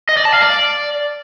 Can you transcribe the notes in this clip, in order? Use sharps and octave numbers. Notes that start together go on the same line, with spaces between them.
D#5
D5
A5
F5
D5